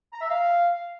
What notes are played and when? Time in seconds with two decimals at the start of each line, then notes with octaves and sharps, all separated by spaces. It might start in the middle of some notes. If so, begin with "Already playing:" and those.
0.13 A#5
0.21 E5
0.30 F5